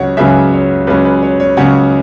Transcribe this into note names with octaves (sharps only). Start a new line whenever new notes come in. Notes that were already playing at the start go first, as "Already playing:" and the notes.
Already playing: C#2 C#3 F#3 C#4 C#5 F#5
C#2 C#3 F#3 C#4 B4 E5
C#5
C#2 C#3 F#3 C#4 B4
B4
C#5
C#5
C#2 C#3 F#3 C#4 C#5 F#5